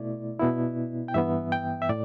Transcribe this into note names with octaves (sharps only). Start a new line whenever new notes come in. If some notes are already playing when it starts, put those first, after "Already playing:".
Already playing: B2 A3 E4 D5
B2 B3 E4
G5
G2 E3 B3 E5
G5
E5
A2 D5